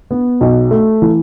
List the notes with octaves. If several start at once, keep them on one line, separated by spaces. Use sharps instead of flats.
B3
B1
A3
E3